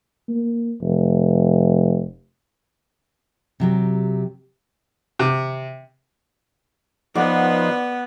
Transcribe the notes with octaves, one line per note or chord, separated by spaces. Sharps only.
A#3
F1
C3 F#3 G4
C3
F3 B3 D#4 B4 C5 D5 F#5